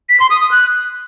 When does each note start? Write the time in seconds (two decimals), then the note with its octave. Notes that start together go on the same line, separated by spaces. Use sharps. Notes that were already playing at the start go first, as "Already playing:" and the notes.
0.09 B6
0.20 C6
0.30 D#6
0.41 D#6
0.51 F#6